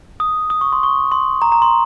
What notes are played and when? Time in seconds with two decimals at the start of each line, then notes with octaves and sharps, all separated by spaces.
0.20 D#6
0.50 D#6
0.61 C#6
0.73 C6
0.83 C#6
1.12 C6
1.42 A#5
1.52 A#5
1.62 C6